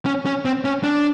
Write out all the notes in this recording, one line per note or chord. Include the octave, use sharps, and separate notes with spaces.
C#4
C#4
C4
C#4
D4